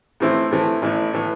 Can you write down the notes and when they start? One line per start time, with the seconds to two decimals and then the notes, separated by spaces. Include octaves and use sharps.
0.20 A2 E3 A3 C4 E4
0.51 A2 E3 A3 C4 E4
0.82 A1 A2 E3 B3
1.14 A2 E3 B3